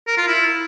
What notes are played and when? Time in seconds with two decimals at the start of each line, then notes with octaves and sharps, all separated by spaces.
0.07 A#4
0.18 F4
0.28 E4